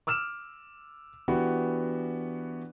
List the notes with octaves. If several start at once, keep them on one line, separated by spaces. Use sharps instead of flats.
D6 E6 F6 E7
E3 B3 D4 F#4 G4